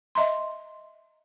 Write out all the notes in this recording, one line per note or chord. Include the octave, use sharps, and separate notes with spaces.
D#5 E5 A#5 C6